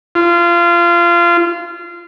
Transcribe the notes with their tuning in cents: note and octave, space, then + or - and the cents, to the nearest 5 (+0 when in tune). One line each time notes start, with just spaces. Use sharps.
F4 -25